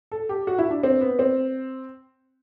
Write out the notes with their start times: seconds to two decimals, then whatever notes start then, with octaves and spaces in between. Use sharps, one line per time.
0.12 A4
0.29 G4
0.47 F#4
0.58 E4
0.70 D4
0.83 C4
1.01 B3
1.19 C4